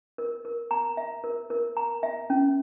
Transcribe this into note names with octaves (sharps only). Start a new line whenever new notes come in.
A#4
A#4
A#5
E5
A#4
A#4
A#5
E5
C#4